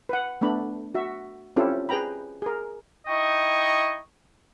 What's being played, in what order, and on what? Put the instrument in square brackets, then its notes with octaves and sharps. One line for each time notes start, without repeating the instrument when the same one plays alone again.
[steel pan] B4 F#5
A3 B3 D4 B5
F#4 E5
C4 C#4 E4 F4 G4 A4
G#4 B4 G5 A#5 B5
G#4 A#4
[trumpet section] D#4 E4 D#5 G5 C#6